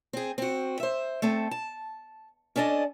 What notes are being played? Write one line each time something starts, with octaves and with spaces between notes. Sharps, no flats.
C4 G#4
C4 F#4
C5 E5
A3 C4 A4
A5
C#4 D4 A4 D5 D#5